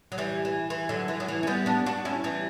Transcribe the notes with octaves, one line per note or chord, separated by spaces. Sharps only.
F#3
E3 G3
E3
E3
D3 F#3
E3
F#3
E3
C#4
G3 B3
B3 D4
D4 F#4
C#4 E4
E3 G3